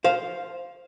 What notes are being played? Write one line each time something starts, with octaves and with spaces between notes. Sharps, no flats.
C5 F5